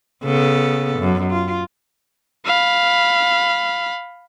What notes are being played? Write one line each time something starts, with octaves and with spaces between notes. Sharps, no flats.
C#3 B3 A4
F#2
F4
F5 B5